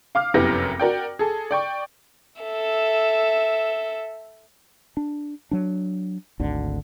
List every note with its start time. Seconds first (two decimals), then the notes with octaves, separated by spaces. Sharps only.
0.15 F5 D6 F6
0.34 F1 F#2 B3 E4 G4 A#6
0.79 F#4 A#4 D5 G5
1.19 G#4 A4
1.51 D5 G5 C#6
2.41 A4 E5
4.97 D4
5.51 F#3 D4
6.39 G#1 D2 D3